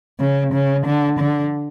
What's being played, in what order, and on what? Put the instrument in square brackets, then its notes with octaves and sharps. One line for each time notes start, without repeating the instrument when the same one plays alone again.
[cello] C#3
C#3
D3
D3